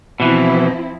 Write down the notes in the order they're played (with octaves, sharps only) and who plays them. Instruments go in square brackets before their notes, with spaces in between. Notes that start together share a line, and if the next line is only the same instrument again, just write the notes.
[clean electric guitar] B2 E3 [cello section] F3 C4 E4